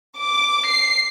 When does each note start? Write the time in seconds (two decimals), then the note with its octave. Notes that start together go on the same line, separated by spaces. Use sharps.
0.17 D6
0.69 C7